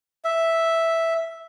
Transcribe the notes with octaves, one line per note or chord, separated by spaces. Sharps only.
E5